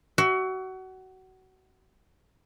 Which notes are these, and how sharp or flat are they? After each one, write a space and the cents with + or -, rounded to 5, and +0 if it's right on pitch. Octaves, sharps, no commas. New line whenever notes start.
F#4 +25 E5 +0